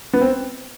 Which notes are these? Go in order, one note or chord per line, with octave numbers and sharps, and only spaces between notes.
B3
C4